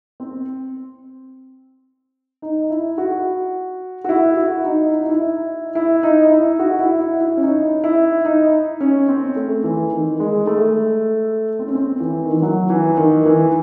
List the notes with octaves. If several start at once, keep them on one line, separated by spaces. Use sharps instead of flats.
C4
D#4
E4
F#4
F#4
E4
F#4
D#4
E4
D#4
E4
E4
D#4
E4
F#4
E4
E4
E4
C#4
D#4
E4
D#4
C#4
C4
A3
E3
D#3
G#3
A3
C4
C#4
C4
E3
D#3
E3
F#3
E3
D#3
E3